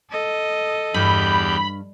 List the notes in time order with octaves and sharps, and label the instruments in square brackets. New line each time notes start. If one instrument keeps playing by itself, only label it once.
[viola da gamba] A4 D#5
[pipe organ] E2 G4 G6 [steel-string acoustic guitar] G2 [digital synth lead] B5